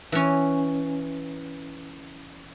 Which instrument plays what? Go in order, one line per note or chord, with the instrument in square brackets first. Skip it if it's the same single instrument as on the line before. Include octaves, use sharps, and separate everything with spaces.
[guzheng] E3 C#4